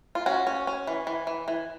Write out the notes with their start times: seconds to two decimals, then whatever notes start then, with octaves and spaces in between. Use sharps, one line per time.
0.15 F4
0.26 C#4 F#4
0.47 C#4
0.67 C#4
0.87 E3
1.07 E3
1.27 E3
1.48 E3